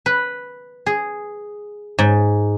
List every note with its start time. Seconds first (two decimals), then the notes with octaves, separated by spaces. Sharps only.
0.06 B4
0.86 G#4
1.99 G#2